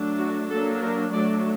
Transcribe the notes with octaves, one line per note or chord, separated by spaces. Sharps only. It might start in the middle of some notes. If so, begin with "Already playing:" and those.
Already playing: F#3 A3 D4
F#4
F#3 A#3 D4 A4
A#4
F#3 A3 D4 D5